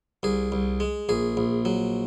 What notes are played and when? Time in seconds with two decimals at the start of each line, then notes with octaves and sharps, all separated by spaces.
0.23 C2 G#4
0.52 C2
0.80 G#3
1.09 A#1 G#4
1.37 A#1
1.65 F#3